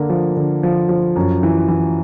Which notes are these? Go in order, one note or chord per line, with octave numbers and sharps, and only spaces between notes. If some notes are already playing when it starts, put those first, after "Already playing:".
Already playing: D3 A#3
F3
D3
F3
F3
F#2
E3
E3